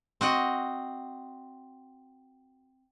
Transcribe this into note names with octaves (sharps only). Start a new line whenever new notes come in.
C4 F#4 D#5 F#5